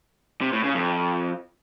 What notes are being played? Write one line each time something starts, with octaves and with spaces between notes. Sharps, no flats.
C3
A2
C#3
F2